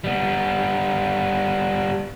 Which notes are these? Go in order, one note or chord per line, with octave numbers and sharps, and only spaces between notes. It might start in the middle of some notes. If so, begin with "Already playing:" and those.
G3 B3